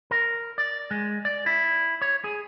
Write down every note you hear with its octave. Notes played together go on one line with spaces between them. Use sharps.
A#4
D5
G#3
D5
E4
C#5
G#4